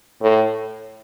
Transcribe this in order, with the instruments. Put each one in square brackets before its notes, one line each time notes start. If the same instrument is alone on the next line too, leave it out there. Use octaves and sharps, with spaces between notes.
[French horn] A2